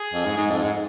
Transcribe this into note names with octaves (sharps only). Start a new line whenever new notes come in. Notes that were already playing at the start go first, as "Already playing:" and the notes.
Already playing: G#4
F2
G#2
G#2
F2
G#2